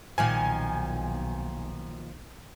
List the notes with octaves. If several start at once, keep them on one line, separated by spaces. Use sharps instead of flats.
B1 A#2 D#3 F3 G#5